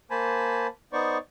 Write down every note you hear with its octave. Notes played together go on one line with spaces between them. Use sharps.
A#3 C5 G#5 A5 B5
B3 D#4 C5 D5 C#6